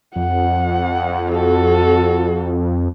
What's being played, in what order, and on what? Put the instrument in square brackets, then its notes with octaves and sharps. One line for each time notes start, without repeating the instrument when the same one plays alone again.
[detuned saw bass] F2 [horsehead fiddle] F#5
[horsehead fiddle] F#4 A4